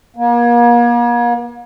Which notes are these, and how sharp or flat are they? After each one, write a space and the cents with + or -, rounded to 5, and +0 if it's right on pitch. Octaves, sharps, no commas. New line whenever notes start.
A#3 +40